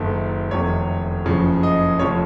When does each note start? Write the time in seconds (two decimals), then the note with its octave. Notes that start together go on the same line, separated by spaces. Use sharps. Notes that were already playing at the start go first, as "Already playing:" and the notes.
Already playing: F#1 F#2 D#3 A4
0.51 F1 F2 C3 D#3 C#5
1.26 F#1 F2 C#3 F3
1.63 D#5
1.99 F1 F2 C#3 F3 C#5